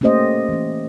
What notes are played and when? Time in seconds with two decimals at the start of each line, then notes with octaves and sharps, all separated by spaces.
0.01 A3 A#3 C#4 G4 C5 D#5
0.49 E3 C#4